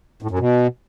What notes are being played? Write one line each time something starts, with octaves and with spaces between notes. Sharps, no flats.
A2
F#2
B2